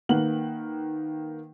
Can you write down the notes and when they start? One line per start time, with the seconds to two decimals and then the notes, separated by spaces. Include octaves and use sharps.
0.09 D#3 A#3 B4 F#5 F#7